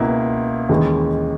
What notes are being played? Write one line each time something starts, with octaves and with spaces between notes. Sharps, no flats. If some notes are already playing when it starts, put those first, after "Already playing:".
Already playing: C#2 B2 A#3 E4
D#2 C#3 E3 G#3 D#4